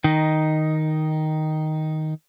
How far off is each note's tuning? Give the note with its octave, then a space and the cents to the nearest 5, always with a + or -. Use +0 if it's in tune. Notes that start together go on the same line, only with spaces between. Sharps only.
D#3 +0 D#4 +0